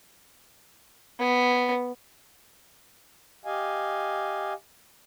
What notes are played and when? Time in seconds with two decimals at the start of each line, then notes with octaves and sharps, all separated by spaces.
1.19 B3
3.45 G4 D#5 F5 G#5